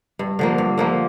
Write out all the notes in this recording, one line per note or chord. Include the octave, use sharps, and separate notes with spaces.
G2
D3 F3 A#3
G2
D3 F3 A#3